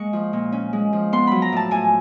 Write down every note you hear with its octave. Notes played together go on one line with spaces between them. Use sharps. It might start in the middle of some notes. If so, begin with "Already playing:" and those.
Already playing: G#3 A#3 C#6
F3
A#2
C#4
G#3
F3
B3 C6
F#3 B5
A#5
A2 A5
A2 G#5